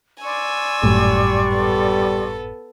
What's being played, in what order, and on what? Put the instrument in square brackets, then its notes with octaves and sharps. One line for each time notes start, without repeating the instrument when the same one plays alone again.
[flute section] D5 C6 C#6 [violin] G#5 E6
[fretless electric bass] G#1 F#2 A2 [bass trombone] G3
[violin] B3 A4